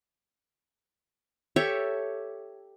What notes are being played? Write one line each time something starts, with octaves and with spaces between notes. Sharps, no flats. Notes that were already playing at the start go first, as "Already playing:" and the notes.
G4 A4 C#5 E5